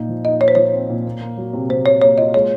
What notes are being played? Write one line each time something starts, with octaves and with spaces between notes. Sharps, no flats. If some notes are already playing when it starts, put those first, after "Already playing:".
Already playing: A#2 D#4
F3
D#4 D#5
D#4 C#5
C5
F3 C#5
C4
A#2
A#3
A#3
F#3
C3
C3 C5
C3 C#5
A#3 C#5
F4 D#5
G#3 C#5